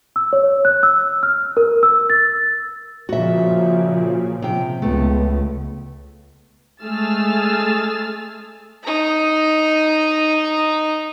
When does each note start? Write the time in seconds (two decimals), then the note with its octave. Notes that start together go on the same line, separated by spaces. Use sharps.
0.16 E6
0.33 C#5
0.65 F#6
0.83 E6
1.23 F6
1.57 A#4
1.83 E6
2.10 A6
3.09 A#2 C#3 F3 F#4 E5
4.42 C3 G5
4.82 C#2 A3 B3
6.83 G#3 A3 G#4 E6 F6 A6
8.84 D#4 A#5